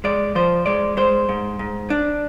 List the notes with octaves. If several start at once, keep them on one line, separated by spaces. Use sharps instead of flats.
G#3 D5
F3 C5
G#3 D5
G#3 C5
G#2
G#2
D4